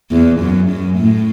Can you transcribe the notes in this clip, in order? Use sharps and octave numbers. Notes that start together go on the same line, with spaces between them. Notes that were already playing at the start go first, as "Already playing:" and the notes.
E2
F#2
F#2
A2